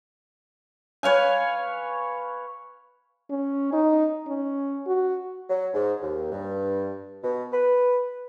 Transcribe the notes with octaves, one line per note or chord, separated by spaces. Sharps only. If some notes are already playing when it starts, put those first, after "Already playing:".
B4 C#5 F5 G#5
C#4
D#4
C#4
F#4
F#3
G#2
D#2
G2
B2
B4